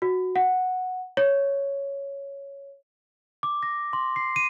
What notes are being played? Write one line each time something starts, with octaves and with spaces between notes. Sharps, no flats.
F#4
F#5
C#5
D6
A#6
C6
C7
D#7